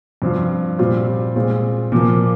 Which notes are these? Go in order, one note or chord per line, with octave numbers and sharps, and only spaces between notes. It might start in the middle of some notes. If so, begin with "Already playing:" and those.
G2 F3 C4 F4
A#2 G3 C4 F4
A#2 G#3 C4 F4
A#2 F3 A#3